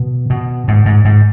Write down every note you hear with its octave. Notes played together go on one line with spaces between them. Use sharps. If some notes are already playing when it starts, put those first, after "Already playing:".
Already playing: B2
B2
G#2
G#2
G#2